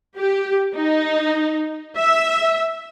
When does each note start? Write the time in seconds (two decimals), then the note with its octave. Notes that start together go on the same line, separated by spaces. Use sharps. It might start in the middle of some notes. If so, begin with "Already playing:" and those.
0.17 G4
0.75 D#4
1.97 E5